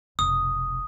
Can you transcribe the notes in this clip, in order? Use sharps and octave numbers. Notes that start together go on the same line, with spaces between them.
F1 B1 D#6